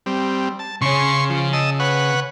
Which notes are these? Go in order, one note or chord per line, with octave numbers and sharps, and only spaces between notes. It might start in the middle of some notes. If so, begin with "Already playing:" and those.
G3 C4
A5
C#3 C#4 C#5 C6 C#6
F3
D#5 A5 E6
B4 C#5 F#5